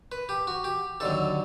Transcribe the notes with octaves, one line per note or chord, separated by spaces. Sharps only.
B4
G4
F#4
G4
D#2 D3 F#3 A4